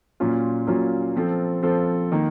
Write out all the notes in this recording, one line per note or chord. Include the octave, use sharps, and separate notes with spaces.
A#2 F#3 A#3 C#4 F4
A#2 F#3 A#3 C#4 F4
F3 C4 F4 A4
F3 C4 F4 A4
D#3 A#3